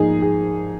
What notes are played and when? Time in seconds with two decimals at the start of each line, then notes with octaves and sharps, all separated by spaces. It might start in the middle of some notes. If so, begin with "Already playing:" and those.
Already playing: G#2 F3 A#3 D#4 G#4
0.22 G#4